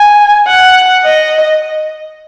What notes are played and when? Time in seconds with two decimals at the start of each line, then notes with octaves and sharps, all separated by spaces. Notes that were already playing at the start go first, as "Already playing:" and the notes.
Already playing: G#5
0.48 F#5
1.04 D#5